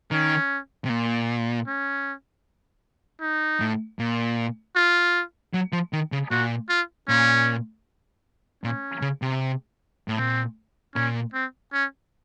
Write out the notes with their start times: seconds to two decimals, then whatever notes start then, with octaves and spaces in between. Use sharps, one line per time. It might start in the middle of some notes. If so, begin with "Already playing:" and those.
0.11 D#3 C#4
0.85 C3
0.89 A#2
1.67 C#4
3.21 D#4
3.60 A2
3.99 A#2
4.76 F4
5.54 F#3
5.72 F3
5.93 D#3
6.12 C#3
6.31 A#2 F#4
6.69 F4
7.08 A#2 C#4
8.64 A#2 C#4
9.02 C#3
9.22 C3
10.08 A2
10.18 A#2 C4
10.95 A#2 C#4
11.34 C4
11.73 C#4